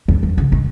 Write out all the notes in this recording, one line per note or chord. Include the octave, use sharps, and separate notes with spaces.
F2
F#2
C#3
D#3